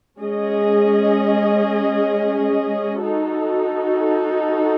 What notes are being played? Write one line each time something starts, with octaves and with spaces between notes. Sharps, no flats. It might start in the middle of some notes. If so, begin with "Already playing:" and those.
G#3 C#4 G#4 D#5
D#4 F#4 A4